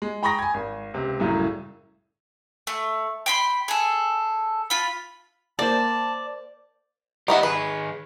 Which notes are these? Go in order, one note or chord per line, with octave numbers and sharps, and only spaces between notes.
G#3
G5 A#5 B5 C#6 D#6 A#6
G#5 G#6
G#1
C#2 C3
C2 F#2 A2 C#3 F#3
A3
G5 B5 C6
G#4 A4
F4 B5
A#3 C5 D5 A5
D#3 B3 G4 D#5 E5
D#3 G#4 B4